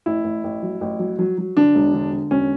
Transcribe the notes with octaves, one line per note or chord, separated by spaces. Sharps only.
A1 E4
A1
A1
F#3
A1
F#3
F#3
F#3
D3 D4
E1
D3
D3
E1 C#4